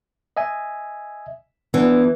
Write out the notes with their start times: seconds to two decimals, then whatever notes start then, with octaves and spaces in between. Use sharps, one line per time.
0.37 D#5 E5 G#5
1.74 E3 B3 D4